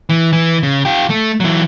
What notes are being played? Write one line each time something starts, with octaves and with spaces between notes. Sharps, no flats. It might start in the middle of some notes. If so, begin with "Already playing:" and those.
E3
E3
C#3
F4 G4
A3
E3 F#3